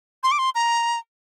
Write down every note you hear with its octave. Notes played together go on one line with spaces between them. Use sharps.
C6
D6
C6
A#5